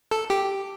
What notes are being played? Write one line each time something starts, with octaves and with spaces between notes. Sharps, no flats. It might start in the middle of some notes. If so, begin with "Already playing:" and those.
A4
G4